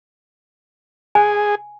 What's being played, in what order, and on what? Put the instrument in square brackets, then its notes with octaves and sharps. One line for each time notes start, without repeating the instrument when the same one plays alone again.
[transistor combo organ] G#4 [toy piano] G#5